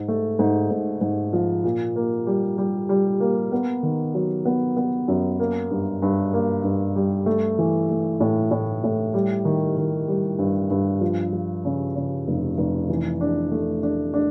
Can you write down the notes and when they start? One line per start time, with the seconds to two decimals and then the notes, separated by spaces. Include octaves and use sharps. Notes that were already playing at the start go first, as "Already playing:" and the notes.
Already playing: G#2
0.08 A3
0.39 G#2
0.70 G#2
1.01 G#2
1.33 F3
1.64 A#2
1.96 A#3
2.27 G3
2.58 G3
2.89 G3
3.20 A#3
3.52 B3
3.83 D#3
4.14 F#3
4.45 B3
4.77 B3
5.08 F#2
5.40 A#3
5.71 G2
6.02 G2
6.33 A#3
6.64 G2
6.96 G3
7.26 A3
7.59 E3
7.89 A3
8.20 A2
8.51 A2
8.84 A2
9.14 G3
9.45 D#3
9.77 D#3
10.08 G3
10.39 G2
10.70 G2
11.01 F3
11.33 F3
11.65 C#3
11.96 C#3
12.27 F1
12.58 F1
12.89 E3
13.21 D4
13.52 A3
13.83 D4
14.14 D4